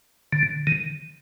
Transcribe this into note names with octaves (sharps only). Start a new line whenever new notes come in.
D3
D#3